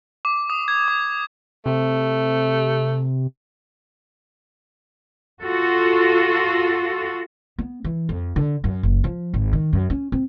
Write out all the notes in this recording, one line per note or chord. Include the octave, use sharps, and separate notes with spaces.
D6
D#6
G#6
D6
C3 A3
F4 F#4 A4
B3
E3
F2
D3
F#2
F#1
F3
G#1
D#3
F#2
C#4
C4